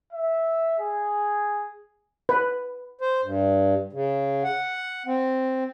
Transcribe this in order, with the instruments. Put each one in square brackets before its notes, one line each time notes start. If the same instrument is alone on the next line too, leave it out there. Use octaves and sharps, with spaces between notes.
[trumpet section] E5
G#4
[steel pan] B4
[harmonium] C5
G2
C#3
F#5
C4